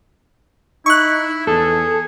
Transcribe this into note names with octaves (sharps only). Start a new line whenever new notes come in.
D#4 E4 C#6 F#6
E2 G#4 A4